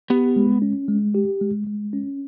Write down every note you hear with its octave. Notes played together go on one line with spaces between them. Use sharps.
B3 G4
G#3
C#4
G#3
G4
G#3
G#3
C#4